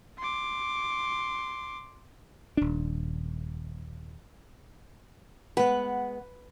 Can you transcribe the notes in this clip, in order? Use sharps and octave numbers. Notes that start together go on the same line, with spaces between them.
C6 D6
D#1 D4
G#3 B3 B4 F#5